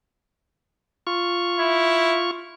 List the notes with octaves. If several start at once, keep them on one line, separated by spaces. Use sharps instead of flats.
F4 C#6
E4